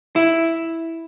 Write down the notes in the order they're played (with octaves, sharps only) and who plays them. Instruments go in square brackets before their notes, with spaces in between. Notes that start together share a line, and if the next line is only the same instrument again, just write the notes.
[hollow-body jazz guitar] E4